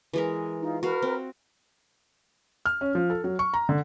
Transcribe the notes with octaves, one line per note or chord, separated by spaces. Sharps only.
E3 G#3 A#4
D#4 F4
F#4 A#4 B4 F5 F6
C4
F6
C#4
F3
A4
F#3
C#6
A#5
D3